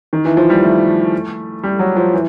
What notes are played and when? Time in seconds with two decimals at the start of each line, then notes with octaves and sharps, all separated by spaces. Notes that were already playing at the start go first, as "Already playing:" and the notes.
0.13 D#3
0.25 E3
0.37 F3
0.50 G3
0.63 A3
1.63 G3
1.79 F#3
1.96 F3
2.13 E3